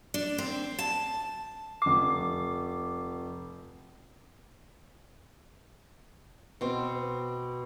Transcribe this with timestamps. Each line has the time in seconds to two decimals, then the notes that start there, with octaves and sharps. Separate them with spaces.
0.14 D4
0.38 C4
0.79 A5
1.82 F1 D6 C7
6.61 B2 C4